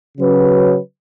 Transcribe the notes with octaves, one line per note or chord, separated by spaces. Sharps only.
C#3 F#3 C#4 F#4 B4